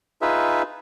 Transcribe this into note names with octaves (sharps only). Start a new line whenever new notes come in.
D#4 F4 G#4 B4 E5